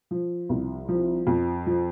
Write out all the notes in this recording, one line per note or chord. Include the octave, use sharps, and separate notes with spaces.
F3
C2
F3
F2
F3